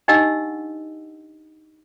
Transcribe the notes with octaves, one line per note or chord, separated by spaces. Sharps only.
D4 D#4 G4 D#5 F#5 E6